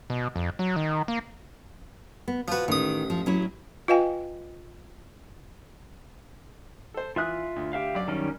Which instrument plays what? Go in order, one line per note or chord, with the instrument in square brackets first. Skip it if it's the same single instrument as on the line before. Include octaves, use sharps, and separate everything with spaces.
[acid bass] B2
F2
F#3
D#3
A#3
[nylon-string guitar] B3
[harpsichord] F3 B4 [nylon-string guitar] F4 F#4
[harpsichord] A1 D#6 [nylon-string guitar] D#3
[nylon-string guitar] F3
F#3 C#4 E4
[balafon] F4 B4 D#5 F5 G5 G#5
[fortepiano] A4 C5
[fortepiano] E3 D#6 [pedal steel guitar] F4 E5 F#6
[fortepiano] D2
[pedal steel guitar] G4 E5 F5
[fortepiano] F#2 D5
[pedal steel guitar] D#3 G3 C#4